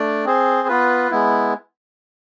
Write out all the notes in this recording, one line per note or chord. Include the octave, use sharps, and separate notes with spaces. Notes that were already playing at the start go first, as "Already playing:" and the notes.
Already playing: A3 D4 D5
C4 G#4 C5
B3 F4 B4
G#3 B3 E4